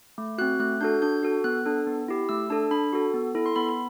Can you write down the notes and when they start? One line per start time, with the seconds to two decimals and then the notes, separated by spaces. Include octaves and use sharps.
0.18 A3
0.38 F#4 F#6
0.41 C4
0.60 A3 F#6
0.81 D4 F#4 A4 G6
1.02 D4 G6
1.23 F#4 A4
1.44 B3 F#6
1.66 D4 A4
1.87 B3
2.08 E4 G4
2.29 A3 E6
2.50 D4 A4 A5
2.71 D4 B5
2.93 F#4 A4
3.14 B3
3.35 E4 A4
3.46 C6
3.56 B3 B5
3.69 B5